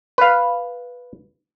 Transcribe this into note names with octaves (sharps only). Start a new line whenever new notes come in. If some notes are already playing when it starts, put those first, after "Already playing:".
B4 F5